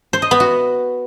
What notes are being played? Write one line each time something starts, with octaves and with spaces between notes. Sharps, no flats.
C5
D#5
B3
F#4